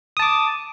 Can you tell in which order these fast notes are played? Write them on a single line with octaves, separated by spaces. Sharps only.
D#6 A5 D6